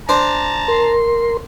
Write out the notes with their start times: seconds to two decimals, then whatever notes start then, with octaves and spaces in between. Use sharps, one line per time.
0.09 D4 C5 A5 A#5
0.68 A#4 C6